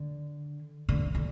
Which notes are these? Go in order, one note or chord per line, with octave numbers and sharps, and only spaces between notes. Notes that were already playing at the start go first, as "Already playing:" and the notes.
Already playing: D3
D3
D3